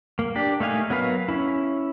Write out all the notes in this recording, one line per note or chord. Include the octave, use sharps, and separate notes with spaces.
A#3
D4 G4
A3 A#3 D#4 F5 G#5
F#3 B3 A#4 B4 F5
C#4 E4